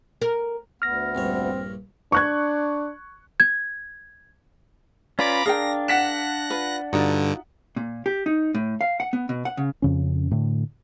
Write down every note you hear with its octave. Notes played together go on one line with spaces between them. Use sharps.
A#4
D2 B3 F6 A#6
A#1 G2 C4 C#5
D4 C#6 F#6 G#6
G#6
C#4 F4 B4 D5 A#5 B5 D6
D4 G#4 A#4 F5 G5 A#6
F#5 F#6 A#6 B6 E7
F4 B4
G2 D3 D#4 F4 F#4
A#2
G4
D#4
A2
F5
F#5
B3
B2
F#5
C#3
F2 C#3 C#4
A2 D3